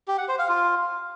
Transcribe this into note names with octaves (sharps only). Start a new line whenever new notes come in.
G4
F#5
C5
F5
F4